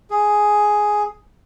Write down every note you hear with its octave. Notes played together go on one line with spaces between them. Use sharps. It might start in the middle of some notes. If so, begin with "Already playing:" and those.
G#4